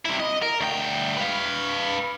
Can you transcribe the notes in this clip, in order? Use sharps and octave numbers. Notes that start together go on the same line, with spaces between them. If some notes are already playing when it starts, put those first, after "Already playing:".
C3 E4
D#5
A#4
D2 G5
B4 F5